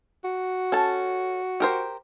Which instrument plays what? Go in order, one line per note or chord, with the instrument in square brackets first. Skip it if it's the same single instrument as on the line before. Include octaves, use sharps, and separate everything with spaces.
[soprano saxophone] F#4
[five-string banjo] C#4 A4 A5
G4 A#4 C5